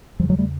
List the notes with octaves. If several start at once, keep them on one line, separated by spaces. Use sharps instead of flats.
E2 C#3 F3 G3
F#3 G#3
G3 A3